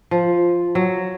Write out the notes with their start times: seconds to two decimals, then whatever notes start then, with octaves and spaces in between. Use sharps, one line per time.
0.11 F3
0.75 F#3